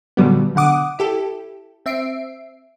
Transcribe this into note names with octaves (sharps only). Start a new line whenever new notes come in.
A#2 D3 F#3 G3 B3
B2 D3 F#5 D6 D#6
E4 G4 A4
C4 E5 C7 D7